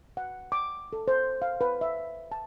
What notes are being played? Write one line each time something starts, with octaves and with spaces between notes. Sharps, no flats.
F#5
D6
A4
C5
F5
B4
E5
A5